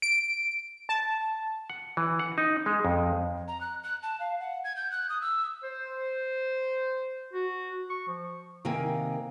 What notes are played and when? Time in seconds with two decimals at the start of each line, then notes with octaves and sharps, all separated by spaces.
0.02 D7
0.89 A5
1.70 F#5
1.97 E3
2.19 F#5
2.38 D#4
2.66 G#3
2.85 F2
3.48 A#5
3.61 F#6
3.83 F#6
4.03 A5
4.20 F5
4.40 F#5
4.65 G#6
4.76 G6
4.91 F#6
5.09 D#6
5.22 E6
5.63 C5
7.33 F#4
7.90 C#6
8.08 F3
8.65 C3 D#3 A#3 A#4 G5 G#5